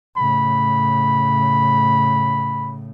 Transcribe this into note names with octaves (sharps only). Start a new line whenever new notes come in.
A2 C#3 B5